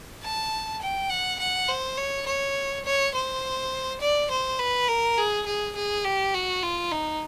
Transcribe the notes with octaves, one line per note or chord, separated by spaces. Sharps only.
A5
G5
F#5
F#5
C5
C#5
C#5
C#5
C5
D5
C5
B4
A#4
G#4
G#4
G#4
G4
F#4
F4
D#4